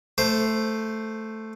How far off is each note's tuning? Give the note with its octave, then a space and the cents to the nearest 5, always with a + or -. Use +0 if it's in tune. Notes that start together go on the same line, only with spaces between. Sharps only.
A3 +0 C5 +0